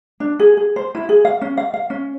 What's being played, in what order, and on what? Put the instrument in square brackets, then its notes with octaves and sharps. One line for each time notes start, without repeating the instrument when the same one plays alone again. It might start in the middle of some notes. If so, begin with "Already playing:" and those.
[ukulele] D4
G#4
G#4
C5
E4
G#4
F5
C#4
F5
F5
C#4